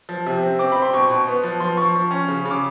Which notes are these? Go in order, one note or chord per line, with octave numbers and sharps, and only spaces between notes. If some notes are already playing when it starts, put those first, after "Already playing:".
F3
C3
C4
C4 D6
C4 B5
C6
B2 C#6
B2
B3
F3
F3 C6
F3 C#6
F3
C#4
C#3
C#3
D6